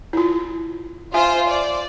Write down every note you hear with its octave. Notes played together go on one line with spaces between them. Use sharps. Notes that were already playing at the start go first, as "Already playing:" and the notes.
E4 F4
F4 C5 E5 G#5
D5